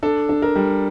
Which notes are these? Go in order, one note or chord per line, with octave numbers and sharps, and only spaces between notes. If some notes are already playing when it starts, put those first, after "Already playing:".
D4 A4
D4
A#4
G3